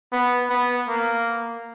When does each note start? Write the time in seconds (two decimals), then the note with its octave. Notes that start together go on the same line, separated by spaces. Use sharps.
0.13 B3
0.50 B3
0.88 A#3